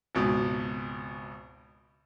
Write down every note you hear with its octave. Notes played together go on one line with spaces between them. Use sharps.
G#1 C#2 B2